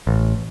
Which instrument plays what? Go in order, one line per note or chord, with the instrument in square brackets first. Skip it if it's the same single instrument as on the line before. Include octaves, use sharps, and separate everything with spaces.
[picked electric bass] A1